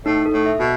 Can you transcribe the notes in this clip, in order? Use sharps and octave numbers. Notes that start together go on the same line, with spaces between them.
A2 D#4
A4
A2
E5
B2